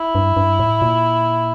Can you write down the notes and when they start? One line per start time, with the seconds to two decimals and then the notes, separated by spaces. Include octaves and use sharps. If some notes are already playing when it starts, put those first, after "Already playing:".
Already playing: E4
0.15 G2
0.37 G2
0.59 A2
0.82 A#2